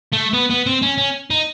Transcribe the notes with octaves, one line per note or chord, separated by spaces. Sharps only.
A3
B3
B3
C4
C#4
C#4
D#4